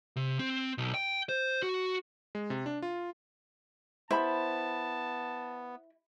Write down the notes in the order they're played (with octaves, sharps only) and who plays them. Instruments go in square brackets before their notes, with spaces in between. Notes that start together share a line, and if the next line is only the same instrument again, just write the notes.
[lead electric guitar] C3
C4
B1
G5
C5
F#4
[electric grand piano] G#3
C3
D4
F4
[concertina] B3 [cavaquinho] E4 [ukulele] C5 B5 [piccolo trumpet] A5